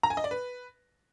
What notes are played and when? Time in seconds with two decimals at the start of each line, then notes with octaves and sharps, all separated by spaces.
0.03 A#5
0.10 G#5
0.17 D#5
0.24 D5
0.31 B4